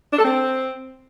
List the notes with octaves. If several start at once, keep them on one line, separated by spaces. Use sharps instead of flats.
D4
A4
C4